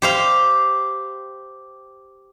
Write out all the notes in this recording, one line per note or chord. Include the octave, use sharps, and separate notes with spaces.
G4 C5 F5